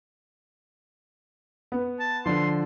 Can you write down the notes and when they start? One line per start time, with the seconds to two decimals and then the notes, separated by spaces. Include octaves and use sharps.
1.72 B3
2.00 A5
2.26 D3 F3 C6